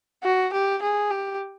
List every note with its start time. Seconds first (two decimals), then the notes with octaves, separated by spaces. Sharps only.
0.23 F#4
0.53 G4
0.82 G#4
1.11 G4